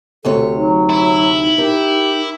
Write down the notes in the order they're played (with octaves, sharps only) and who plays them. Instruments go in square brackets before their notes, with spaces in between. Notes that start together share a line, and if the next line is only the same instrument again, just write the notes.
[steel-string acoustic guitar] D2 C3 C#5 [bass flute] A4
[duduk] F#3 [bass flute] D#4
[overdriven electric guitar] E4
[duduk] G4 [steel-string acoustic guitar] A#4